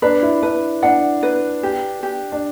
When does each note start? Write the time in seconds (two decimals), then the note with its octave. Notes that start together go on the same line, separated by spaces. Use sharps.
0.02 D4 B4
0.23 E4
0.42 D4 B4
0.83 D4 F#5
1.23 B4
1.63 G4
2.03 G4
2.32 D4